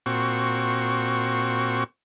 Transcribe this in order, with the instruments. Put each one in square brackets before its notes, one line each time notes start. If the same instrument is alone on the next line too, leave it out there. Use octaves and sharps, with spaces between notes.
[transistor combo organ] A#2 C4 F#4 C#6